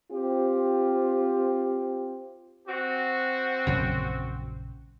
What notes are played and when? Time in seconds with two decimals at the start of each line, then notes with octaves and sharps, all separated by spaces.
0.12 C4 F4 G4 C5
2.67 C4 F#4
3.67 A#1 F#2 C#3